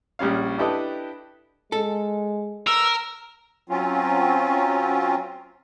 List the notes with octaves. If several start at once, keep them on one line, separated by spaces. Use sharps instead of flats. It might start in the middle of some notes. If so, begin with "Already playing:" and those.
A#1 G3 C#4 F5
D4 E4 G4 A4 B4 D#5
G#3 A4
A#4 E6
F#3 C4 C#4 F4